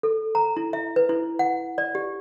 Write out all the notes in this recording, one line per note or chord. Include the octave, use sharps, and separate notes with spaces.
A4
A#5
E4
E5
B4
E4
F#5
D5
G4